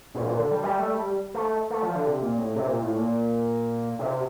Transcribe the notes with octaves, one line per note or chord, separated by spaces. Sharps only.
A#2
A#2
D3
G3
G3
A3
G3
A3
A3
F3
D3
C3
A#2
A2
C3
A#2
A2
A#2
C3